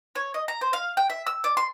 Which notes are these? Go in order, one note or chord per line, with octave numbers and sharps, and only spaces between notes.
C#5
D#5
A#5
C5
F5
G5
E5
E6
D5
C6